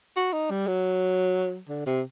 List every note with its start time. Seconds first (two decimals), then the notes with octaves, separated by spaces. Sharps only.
0.16 F#4
0.33 D#4
0.50 G3
0.67 F#3
1.69 D3
1.86 C3